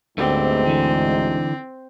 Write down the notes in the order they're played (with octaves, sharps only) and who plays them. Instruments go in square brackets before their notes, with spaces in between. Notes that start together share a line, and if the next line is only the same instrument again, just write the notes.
[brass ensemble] D2 G#2 [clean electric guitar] A3 B3 G4 [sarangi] C4
[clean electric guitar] D3 E3